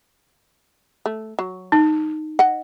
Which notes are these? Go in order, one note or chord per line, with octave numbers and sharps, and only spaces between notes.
A3
F#3
D#4
D#5 F#5